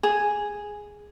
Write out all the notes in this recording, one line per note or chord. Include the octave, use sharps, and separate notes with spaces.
G#4